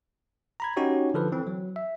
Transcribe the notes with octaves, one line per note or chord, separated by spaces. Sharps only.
A#5 B5 G#6
C#4 D#4 F#4 G4 C#5
D3 F3 A4 B4
E3 C4
F#3
E5